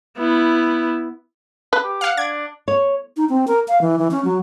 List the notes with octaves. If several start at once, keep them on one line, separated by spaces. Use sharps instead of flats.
B3 E4
B4
G4
F5 F#5
D4 G#6
C#5
D#4
C4
A#4
F5
E3
E3
C#4
F#3